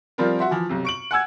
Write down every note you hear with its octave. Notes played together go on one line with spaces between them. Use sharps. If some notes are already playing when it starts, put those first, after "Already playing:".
F3 G3 C4 F4 A#4
F#4 E5 C6
E3 F3
B1 C3
C#6 D7 F#7
F#5 G#5 E6 G#6